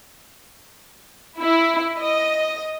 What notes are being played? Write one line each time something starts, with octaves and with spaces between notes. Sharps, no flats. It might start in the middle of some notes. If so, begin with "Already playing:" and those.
E4
D#5